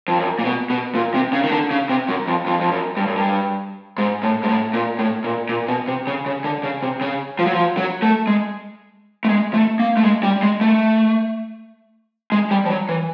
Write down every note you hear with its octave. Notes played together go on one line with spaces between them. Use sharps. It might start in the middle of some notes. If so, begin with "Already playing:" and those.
F2
F#2
A#2
B2
B2
A#2
C3
C#3
D#3
D3
C#3
C3
F#2
F2
F2
F2
F#2
G2
F#2
G2
G#2
A2
G#2
A2
A#2
A2
A#2
A#2
B2
C3
C#3
C#3
D3
C#3
C3
C#3
F3
F#3
F3
F#3
A3
G#3
A3
G#3
A3
A#3
A3
G#3
G3
G#3
A3
G#3
G3
F3
F#3
E3